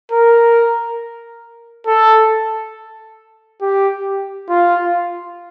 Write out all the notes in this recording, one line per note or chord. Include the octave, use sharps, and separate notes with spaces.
A#4
A4
G4
F4